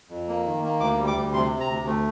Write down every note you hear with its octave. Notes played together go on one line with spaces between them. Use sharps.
F2
A#3
D#3
A#3
D2 D6
G3
D6
D2
C3 C6
C3
A#5
D2
A3